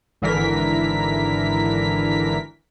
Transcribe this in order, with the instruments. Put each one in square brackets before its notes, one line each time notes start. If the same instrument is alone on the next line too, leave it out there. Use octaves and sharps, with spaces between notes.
[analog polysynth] G#1 D3 E3 A#4 B6